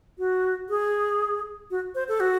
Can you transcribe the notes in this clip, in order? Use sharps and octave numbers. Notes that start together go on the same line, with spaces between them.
F#4
G#4
F#4
C5
A4
F#4